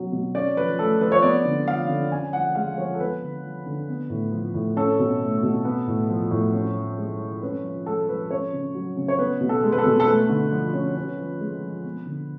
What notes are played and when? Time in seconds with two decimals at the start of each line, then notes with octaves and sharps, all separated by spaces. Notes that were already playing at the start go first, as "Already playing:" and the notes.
Already playing: B2 F#3 C#4
0.12 B2
0.35 C#4 D5
0.57 F3 B4
0.79 A3 A4
1.01 F3 B4
1.12 C#5
1.22 B3 D5
1.45 D3
1.67 F3 F5
1.89 D3
2.11 C#4 G#5
2.33 F3 F#5
2.55 G#3 F5
2.78 F3 C#5
2.94 A4
3.00 B3 B4
3.22 D3
3.44 F3
3.66 D3
3.89 B3
4.10 A2
4.32 F3
4.54 A2
4.76 C#4 A4
4.99 B2
5.22 A3
5.43 B2
5.65 B3
5.87 A2
6.09 F3
6.31 A2
6.54 C#4
6.76 F3
6.98 G#3
7.20 F3
7.42 C#4 B4
7.64 F3
7.86 G#3 A4
8.09 F3 B4
8.30 C#4 C#5
8.52 C#3
8.74 F#3
8.97 C#3
9.08 C#5
9.19 B3 B4
9.41 B2
9.49 A4
9.64 G#3
9.72 B4
9.78 A4
9.86 B2
10.00 A4
10.07 A3 B4
10.29 D3
10.52 F3
10.73 C#4
10.96 C#4
11.18 F3
11.41 G#3
11.62 F3
11.84 B3
12.06 D3